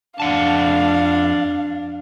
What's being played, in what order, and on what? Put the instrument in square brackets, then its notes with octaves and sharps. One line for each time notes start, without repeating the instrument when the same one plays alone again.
[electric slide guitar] F2 F#5 A5 [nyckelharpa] D4 [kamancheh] F5